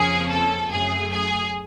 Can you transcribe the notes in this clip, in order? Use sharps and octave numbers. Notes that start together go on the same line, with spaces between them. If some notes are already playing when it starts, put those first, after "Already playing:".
Already playing: F2 C#3 F3 A#3 C#4 G#4 G#5
A4 A5
F#2 C#3 F#3 A3 G#4 G#5
G#4 G#5